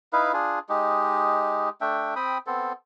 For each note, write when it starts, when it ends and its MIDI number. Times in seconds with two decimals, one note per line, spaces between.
0.13 0.32 63
0.13 0.32 64
0.13 0.32 71
0.13 0.32 77
0.33 0.59 62
0.33 0.59 65
0.33 0.59 68
0.69 1.69 56
0.69 1.69 63
0.69 1.69 67
1.81 2.14 57
1.81 2.14 62
1.81 2.14 76
1.81 2.14 79
2.16 2.38 60
2.16 2.38 79
2.16 2.38 83
2.16 2.38 87
2.47 2.73 59
2.47 2.73 60
2.47 2.73 69
2.47 2.73 72